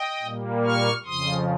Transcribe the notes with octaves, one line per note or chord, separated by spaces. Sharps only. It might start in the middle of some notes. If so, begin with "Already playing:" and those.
Already playing: D#5 G5
A#2 G3 A#3
C#6 F6
F2 C#3 F3 C6 D#6